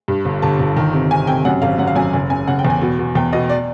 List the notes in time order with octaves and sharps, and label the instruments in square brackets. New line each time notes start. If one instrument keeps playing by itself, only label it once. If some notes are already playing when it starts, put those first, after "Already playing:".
[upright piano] G2
G1
G1 A5
G1
D#3
C3
C3 G#5
C3 G5
F#2 F#5
G#1 F5
F#2 F#5
F5
F#2 G#5
F#1 G#5
C#3 G#5
C#3 F#5
G5
E2
G#5
B2
B2
E2 G5
B2 D#5
D5